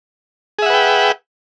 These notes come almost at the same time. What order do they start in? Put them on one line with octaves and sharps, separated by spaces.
G#4 E5 F#5 B4 G5